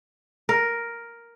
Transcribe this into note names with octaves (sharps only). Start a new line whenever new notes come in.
A#4